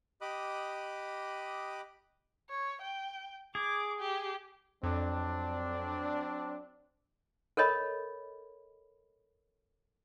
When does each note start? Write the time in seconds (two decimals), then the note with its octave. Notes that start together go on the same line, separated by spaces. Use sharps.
0.21 G4 D#5 B5 D6 D#6 F#6
2.50 C#5
2.82 G5
3.55 G#4 D6
3.99 G4
4.83 F2 F#3 C4 D4
7.57 A4 A#4 C#5 D#5 B5